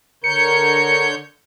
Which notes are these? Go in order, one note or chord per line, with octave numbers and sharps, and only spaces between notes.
D3 A#4 C#5 G6 C#7